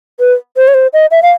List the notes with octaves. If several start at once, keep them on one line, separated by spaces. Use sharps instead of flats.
B4
C5
C#5
C5
D#5
E5
F5